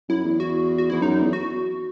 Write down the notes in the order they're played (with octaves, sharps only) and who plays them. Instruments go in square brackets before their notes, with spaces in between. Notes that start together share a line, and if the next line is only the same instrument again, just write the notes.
[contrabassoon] F#2 [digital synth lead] E4
[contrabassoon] E2
[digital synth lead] F#4
F#4
[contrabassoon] E2 [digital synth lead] E4
[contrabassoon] F#2 [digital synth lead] D#4
[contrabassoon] E2
[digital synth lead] F#4